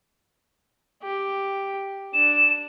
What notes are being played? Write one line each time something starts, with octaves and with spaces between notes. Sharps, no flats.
G4
D4 E7